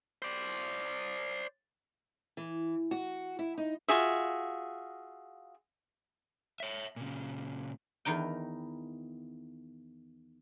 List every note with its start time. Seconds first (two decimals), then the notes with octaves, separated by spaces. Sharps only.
0.22 C5 D5
2.37 E3
2.91 F#4
3.39 E4
3.58 D#4
3.88 F4 F#4 G#4 E5
6.60 C#5 E5
6.96 A#2 C#3
8.05 E2 D#3 D#4 G5